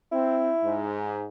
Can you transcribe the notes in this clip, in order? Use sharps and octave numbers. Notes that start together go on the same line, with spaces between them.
C4 E4
G#2